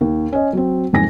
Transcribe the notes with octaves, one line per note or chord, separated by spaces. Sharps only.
D#2
C#4 D#5
F#3 C4
F#1 F2 G#2 G#5 A#6